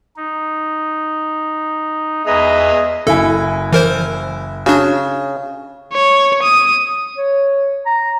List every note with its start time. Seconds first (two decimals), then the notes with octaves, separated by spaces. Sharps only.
0.17 D#4
2.27 E2 G#4 B4 D#5 E5 A#5
3.07 F#1 E4 A4 G#5
3.73 E3 A#4 C5
4.66 C#3 D4 F#4
5.93 C#5
6.43 D#6
7.18 C#5
7.86 A#5